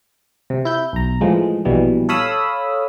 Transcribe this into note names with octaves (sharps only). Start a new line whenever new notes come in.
C3
E4 G6
B1 A#5
A2 E3 F3 G#3
A#1 B2 E3 G3
A4 C#5 F5 B5 D#6 E6